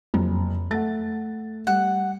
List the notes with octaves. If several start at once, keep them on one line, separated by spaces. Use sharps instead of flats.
F#1 F2
A3 F#5 A6
G3 F#5